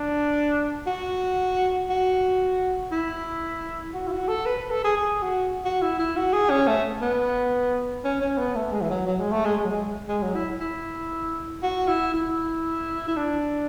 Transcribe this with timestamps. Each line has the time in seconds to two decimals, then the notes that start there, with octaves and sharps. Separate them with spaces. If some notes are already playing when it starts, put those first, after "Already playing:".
Already playing: D4
0.87 F#4
1.90 F#4
2.92 E4
3.94 F#4
4.07 E4
4.12 F#4
4.28 A4
4.46 B4
4.58 B4
4.70 A4
4.84 G#4
4.97 G#4
5.23 F#4
5.65 F#4
5.82 E4
5.99 E4
6.17 F#4
6.33 G#4
6.50 C#4
6.68 A3
7.02 B3
8.05 C#4
8.22 C#4
8.38 B3
8.55 A3
8.72 G#3
8.81 E3
8.90 F#3
9.07 F#3
9.19 G#3
9.32 A3
9.45 G#3
9.58 G#3
9.65 F#3
9.71 G#3
10.09 G#3
10.22 F#3
10.35 E4
10.60 E4
11.63 F#4
11.88 E4
12.14 E4
13.08 E4
13.17 D4